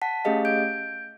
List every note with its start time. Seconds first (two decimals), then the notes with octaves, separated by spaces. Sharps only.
0.02 F#5 A5 B6
0.25 A3 C#4 G4 G#4 D#5 F5
0.45 G6 D7